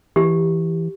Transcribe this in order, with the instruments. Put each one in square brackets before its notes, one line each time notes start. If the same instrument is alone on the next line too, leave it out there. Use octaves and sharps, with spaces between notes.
[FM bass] E3 [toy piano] G4